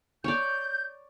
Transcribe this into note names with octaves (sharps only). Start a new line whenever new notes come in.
C#5 D5 G6